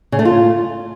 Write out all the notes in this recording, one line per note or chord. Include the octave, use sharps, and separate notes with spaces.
C#3
A3
F4